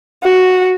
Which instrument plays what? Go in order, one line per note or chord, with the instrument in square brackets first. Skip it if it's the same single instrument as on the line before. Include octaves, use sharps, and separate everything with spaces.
[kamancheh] F#4